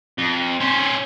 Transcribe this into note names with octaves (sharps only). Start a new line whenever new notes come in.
F2
C#4 C5